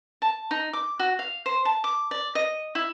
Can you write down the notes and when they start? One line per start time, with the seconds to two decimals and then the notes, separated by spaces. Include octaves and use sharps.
0.22 A5
0.51 D#4
0.73 D6
0.99 F#4
1.19 F5
1.46 C5
1.65 A5
1.84 D6
2.11 D5
2.35 D#5
2.75 E4